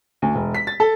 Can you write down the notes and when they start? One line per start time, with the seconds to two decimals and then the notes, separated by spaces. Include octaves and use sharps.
0.22 D2
0.35 E1
0.55 B6
0.67 A6
0.80 A4